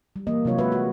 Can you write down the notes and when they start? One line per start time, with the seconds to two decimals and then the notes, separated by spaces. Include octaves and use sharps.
0.16 G3
0.27 E3 A#3 D#5
0.45 C3 F#3 F4 C#5
0.58 G#3 F#4 B4 E5
0.72 F#4